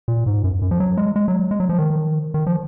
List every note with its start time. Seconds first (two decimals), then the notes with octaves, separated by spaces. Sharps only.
0.08 A#2
0.26 G#2
0.44 F#2
0.62 F#2
0.71 F3
0.80 F#3
0.97 G#3
1.16 G#3
1.28 F#3
1.51 G#3
1.60 F#3
1.69 F3
1.78 D#3
2.34 D#3
2.47 F3